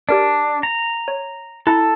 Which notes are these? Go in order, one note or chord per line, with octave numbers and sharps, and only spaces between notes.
D4 G4 A#4 D5
A#5
C#5
E4 A4 A#5